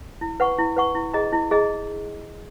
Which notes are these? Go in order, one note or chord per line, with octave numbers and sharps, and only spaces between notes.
E4
B4 F#5 C#6
E4
B4 F#5 C#6
E4
G#4 D#5 A#5
E4
G#4 D#5 A#5